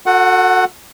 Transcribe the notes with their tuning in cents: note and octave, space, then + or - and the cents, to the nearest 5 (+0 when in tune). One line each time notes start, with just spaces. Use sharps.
F#4 -30 A4 +25 F#5 +10